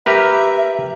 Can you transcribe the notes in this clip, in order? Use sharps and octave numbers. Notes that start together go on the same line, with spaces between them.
G4 A#4 B4 E5